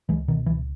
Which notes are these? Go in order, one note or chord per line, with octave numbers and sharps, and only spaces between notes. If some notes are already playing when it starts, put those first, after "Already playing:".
C#2 E3 G#3
B2 D#3
C#2 E3